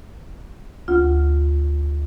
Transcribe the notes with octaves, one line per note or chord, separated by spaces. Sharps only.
D2 F4